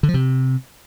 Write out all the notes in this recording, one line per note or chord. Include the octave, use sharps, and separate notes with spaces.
D3
F3
C3